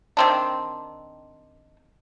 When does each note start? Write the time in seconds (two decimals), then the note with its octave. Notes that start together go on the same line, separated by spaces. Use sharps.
0.17 D#3 C4 D4